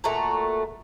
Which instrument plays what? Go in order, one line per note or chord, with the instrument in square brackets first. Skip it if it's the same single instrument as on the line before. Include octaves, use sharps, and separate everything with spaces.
[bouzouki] A#2 A3 F#4 A#5